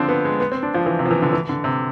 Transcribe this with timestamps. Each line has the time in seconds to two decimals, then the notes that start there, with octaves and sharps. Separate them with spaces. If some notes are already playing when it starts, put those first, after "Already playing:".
Already playing: D3 F3 C4 D4
0.09 B3
0.25 G#3
0.40 B3
0.52 C4
0.63 D4
0.74 F3
0.86 E3
0.99 C3
1.05 F3
1.11 E3
1.22 D3
1.33 E3
1.49 D3
1.64 C3